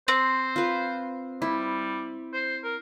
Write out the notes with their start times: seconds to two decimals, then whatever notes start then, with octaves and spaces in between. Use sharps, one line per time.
0.08 C4 C5
0.56 F4 B4
1.42 G3 E4
2.33 C5
2.64 A#4